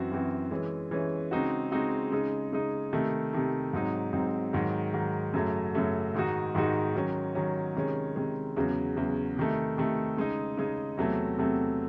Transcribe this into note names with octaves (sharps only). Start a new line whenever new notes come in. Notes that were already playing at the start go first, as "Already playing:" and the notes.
Already playing: F#2 E3 C4 F#4
F#2 E3 C4 F#4
E3 G#3 C#4
E3 G#3 C#4
C#3 G#3 C4 D#4 F#4
C#3 G#3 C4 D#4 F#4
C#3 G#3 D#4
C#3 G#3 D#4
C3 D#3 A3
C3 D#3 A3
G#2 F#3 C4 D#4
G#2 F#3 C4 D#4
G#2 D#3 F#3
G#2 D#3 F#3
F#2 C#3 F#3 A3
F#2 C#3 F#3 A3
G#2 D#3 G#3 D#4 F#4
G#2 D#3 G#3 D#4 F#4
D#3 F#3 C#4
D#3 F#3 C#4
C3 D#3 G#3 C#4
C3 D#3 G#3 C#4
E2 C#3 F#3
E2 C#3 F#3
C3 D#3 A3
C3 D#3 A3
C#3 G#3 D#4
C#3 G#3 D#4
E2 C3 F#3 A3 C4
E2 C3 F#3 A3 C4